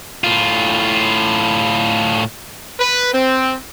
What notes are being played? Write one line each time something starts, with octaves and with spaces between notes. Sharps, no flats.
A2 F4
B4
C4